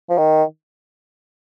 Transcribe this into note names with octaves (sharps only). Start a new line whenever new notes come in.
F3
D#3